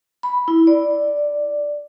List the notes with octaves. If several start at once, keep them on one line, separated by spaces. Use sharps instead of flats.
B5
E4
D5